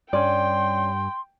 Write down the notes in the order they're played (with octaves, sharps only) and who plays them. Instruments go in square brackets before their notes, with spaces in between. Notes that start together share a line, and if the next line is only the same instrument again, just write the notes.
[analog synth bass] G2 [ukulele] C#4 D5 [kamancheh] G5 [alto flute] C6